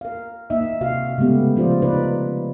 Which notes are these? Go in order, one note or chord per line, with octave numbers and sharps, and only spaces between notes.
A#4 F5
A#3 D#4 D#5 E5
C3 F#4 F5
C#3 G#3 A3 B3 G4
C#3 F3 F4 G#4 C5 D5
D#4 B4 D5